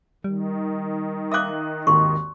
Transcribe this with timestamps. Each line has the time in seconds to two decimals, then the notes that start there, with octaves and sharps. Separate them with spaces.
0.24 D#3 G3
1.32 E5 F5 D6 D#6 F#6
1.87 G#1 D#2 C6 C#6